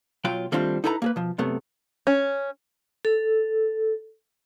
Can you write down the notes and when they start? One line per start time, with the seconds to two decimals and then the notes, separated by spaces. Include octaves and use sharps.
0.24 B1 F#3 F4 G5
0.52 D#3 G3 A3 C4 D4 F4
0.84 D#4 E4 A4 B4 G5 A#5
1.02 A#3 G#4 B4
1.16 B2 F3
1.38 F#2 C3 A3 B3
2.07 C#4
3.05 A4